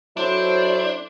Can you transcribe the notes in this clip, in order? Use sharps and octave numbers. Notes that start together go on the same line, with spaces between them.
F#3 D4 E4 A4 C5